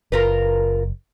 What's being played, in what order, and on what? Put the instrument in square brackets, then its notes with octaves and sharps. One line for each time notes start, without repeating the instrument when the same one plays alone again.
[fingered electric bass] F#1 [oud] F4 A#4 B4